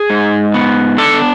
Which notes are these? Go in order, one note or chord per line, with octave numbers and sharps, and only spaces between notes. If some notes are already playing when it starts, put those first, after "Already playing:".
Already playing: G#4
G#2
B3
D4 A4